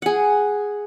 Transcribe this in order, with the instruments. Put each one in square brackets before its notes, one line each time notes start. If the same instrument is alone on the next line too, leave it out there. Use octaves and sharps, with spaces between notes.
[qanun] G#4 F#5